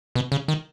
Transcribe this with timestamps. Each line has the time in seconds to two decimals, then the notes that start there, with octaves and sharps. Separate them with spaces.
0.15 B2
0.32 C#3
0.48 D#3